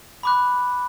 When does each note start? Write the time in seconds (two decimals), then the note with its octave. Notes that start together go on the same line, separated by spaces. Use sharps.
0.23 B5 D6 F#6